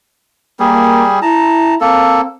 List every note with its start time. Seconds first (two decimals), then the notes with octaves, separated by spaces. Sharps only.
0.60 G3 A#3 G#4
1.22 E4 A5 A#5
1.81 A#3 C4 A4